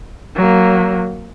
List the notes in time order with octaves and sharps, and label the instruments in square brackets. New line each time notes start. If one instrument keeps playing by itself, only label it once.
[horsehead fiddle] F#3 A#3